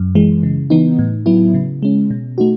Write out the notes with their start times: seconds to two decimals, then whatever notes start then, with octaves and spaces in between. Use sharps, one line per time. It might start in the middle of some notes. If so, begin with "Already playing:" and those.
Already playing: F#2
0.15 E3 G#3
0.43 C#3
0.70 E3 B3 D#4
0.99 A2
1.26 F#3 B3 E4
1.54 C#3
1.83 G#3 C#4
2.10 B2
2.38 A3 D#4 F#4